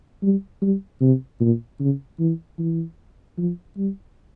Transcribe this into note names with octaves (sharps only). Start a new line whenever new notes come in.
G3
G3
C3
A#2
C#3
E3
E3
F3
G3